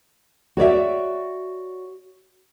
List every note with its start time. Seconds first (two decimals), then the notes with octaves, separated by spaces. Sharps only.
0.57 F#4 C#5 D5 E5